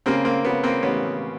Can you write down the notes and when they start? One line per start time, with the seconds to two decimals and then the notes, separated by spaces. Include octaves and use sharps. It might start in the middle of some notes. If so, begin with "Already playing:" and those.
0.06 C#3 A#3 C4
0.25 A#3 C4
0.44 C#3 B3
0.63 A#3 C4
0.83 A1 B3 C#4